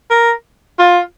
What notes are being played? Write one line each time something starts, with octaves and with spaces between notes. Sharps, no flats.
A#4
F4